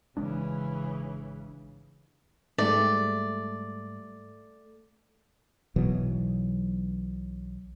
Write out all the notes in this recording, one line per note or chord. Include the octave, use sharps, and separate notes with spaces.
G#1 C#3 E3 G#3 D4
G#2 G3 A3 D5
B1 B2 E3 F#3